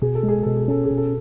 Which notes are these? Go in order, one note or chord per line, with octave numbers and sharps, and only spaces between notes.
B2 G#4
A4
G#3
G#4
B2 A4
G#4
C#4 A4
G#4
B2
A4